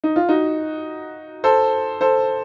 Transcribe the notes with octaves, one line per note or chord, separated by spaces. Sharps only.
D#4
F4
D#4 F#4
A4 C5
A4 C5